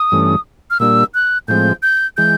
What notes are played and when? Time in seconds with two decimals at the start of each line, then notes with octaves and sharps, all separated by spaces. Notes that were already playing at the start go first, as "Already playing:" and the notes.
Already playing: D#6
0.12 G2 E3 A3 C#4
0.70 F6
0.80 A#2 G3 A#3 D4 E6
1.14 F#6
1.48 A2 F3 G#3 C4 G6
1.82 G6
2.17 E3 G#3 G6